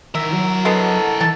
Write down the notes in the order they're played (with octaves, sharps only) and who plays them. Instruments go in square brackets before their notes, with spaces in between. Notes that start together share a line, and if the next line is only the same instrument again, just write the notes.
[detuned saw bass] D#3 [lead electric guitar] E4 A#4 [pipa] E5
[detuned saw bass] F#3
[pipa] D3 G#3 B3 [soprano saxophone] A4
[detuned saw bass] E3 [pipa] A5